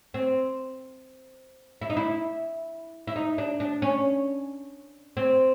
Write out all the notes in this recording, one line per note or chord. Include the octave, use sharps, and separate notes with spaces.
C4
E4
D#4
E4
E4
D#4
D4
D4
C#4
C4